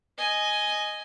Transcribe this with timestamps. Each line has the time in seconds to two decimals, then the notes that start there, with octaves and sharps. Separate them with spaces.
0.18 D#5 G#5